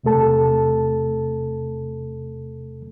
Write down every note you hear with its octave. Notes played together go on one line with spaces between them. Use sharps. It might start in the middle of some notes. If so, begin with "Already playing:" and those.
E2 C3 A3 A4 A5